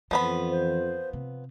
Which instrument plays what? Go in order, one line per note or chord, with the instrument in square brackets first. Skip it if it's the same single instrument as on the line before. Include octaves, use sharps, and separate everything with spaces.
[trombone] F2 [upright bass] E3 [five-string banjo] F3 B3 B5
[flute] C5
[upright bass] C3